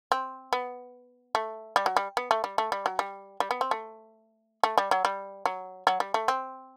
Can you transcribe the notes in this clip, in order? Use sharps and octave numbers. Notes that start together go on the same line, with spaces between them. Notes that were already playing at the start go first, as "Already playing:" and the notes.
C4
B3
A3
G3
F#3
G3
B3
A3
G3
A3
G3
F#3
G3
G3
B3
C4
A3
A3
G3
F#3
G3
F#3
F#3
G3
A3
C4